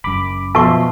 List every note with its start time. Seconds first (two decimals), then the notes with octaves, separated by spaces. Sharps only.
0.04 F#1 F#2 B5 D6
0.55 B2 F3 E5 A5 C6 C#6